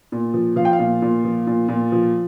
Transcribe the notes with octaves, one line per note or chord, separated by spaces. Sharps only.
A#2
F3
F3 F5
G5
F5
A#2
A#2
F3
A#2
A#2
F3